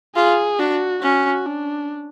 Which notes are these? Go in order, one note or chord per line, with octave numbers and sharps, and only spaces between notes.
F4 G#4
D4 F#4
C#4 F#4
D4